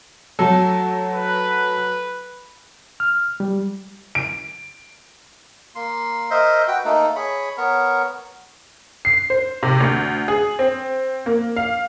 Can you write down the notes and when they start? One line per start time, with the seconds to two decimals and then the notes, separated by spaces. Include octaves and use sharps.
0.39 F#3 A3 A4
1.13 B4
3.00 F6
3.40 G3
4.15 D7
5.75 A#3 C6
6.31 A#4 C5 D#5 E5
6.68 F#4 B4 G5
6.85 A3 A#3 D#4 A4
7.16 G#4 C#5 B5
7.57 B3 A#4 C#5
9.05 C7
9.30 C5
9.63 C3
9.80 D2
10.28 G#4
10.59 C4
11.26 A#3
11.56 F5